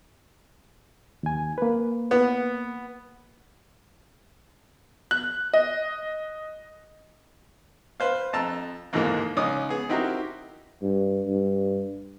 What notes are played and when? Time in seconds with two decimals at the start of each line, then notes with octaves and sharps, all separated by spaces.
1.23 D#2 G#5
1.58 A#3 B4
2.11 B3
5.11 F#6
5.53 D#5
8.00 B4 C5 F5
8.33 F2 A5 A#5 E6
8.93 D#2 G#2 D3 E3 G#3 A#3
9.37 C#2 C#4 D#4 D6 D#6
9.69 B3 G#4
9.89 C4 D#4 E4 F#4 G4 A#4
10.82 G2
11.27 G2